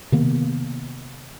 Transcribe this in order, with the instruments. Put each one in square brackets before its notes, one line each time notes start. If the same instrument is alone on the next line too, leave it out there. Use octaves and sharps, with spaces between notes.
[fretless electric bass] C3 D#3 A#3 B3